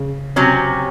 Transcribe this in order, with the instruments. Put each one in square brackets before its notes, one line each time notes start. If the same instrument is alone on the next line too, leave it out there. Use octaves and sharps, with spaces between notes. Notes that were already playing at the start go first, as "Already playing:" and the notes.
Already playing: [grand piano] C#3
[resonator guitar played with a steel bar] C3 F#3 C#4